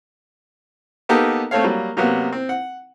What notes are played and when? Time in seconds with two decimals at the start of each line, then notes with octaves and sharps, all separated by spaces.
1.09 A#3 B3 D#4 G4 A4 A#4
1.51 A3 C4 A4 C#5 F5
1.64 F#3 G3 A#3
1.97 C3 F#3 A#3 B3
2.32 C4
2.49 F#5